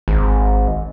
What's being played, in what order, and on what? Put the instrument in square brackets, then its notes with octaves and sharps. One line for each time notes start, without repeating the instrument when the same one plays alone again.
[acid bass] G#1